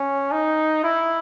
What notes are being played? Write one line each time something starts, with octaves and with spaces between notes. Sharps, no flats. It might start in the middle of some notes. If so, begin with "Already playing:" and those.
Already playing: C#4
D#4
E4